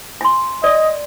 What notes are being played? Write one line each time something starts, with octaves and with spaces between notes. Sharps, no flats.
G#5 C6
D5 D#5